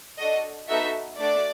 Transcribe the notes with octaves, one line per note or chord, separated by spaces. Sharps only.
D4 F#4 A4 D#5
B3 D#4 F#4 A4 E5
A3 D4 F#4 D5